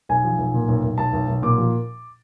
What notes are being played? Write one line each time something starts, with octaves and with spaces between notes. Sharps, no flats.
B1 G#5
F3
B1
A#2
B1
B1
B1 A5
B1
B1
A#2 D6
F3